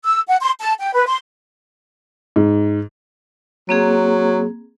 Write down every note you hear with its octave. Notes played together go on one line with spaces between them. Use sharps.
E6
F#5
C6
A5
G5
B4
C6
G#2
F#3 A#3 C4 G#4